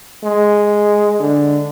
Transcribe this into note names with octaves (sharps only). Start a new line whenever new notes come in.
G#3
D3